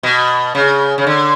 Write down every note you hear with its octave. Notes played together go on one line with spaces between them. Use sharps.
B2
C#3
C#3
D3